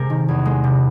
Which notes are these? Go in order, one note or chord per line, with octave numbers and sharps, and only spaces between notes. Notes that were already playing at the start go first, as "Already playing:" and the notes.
Already playing: C3 G#3 A#4
D#3
E2
G#3
C3